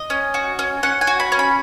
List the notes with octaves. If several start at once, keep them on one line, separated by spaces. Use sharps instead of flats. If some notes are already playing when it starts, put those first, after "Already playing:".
Already playing: D#5
C#4
F#4
C#4
C#4 F#5
G#5
F#4
B5
C#4
B5